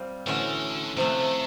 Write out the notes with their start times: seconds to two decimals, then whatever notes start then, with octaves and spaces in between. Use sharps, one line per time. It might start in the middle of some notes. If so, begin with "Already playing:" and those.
Already playing: G3 C4 F4
0.26 A2 D3 E3 A3 C#4 F#4
0.97 C3 D#3 F3 A3
1.08 D3
1.20 D#3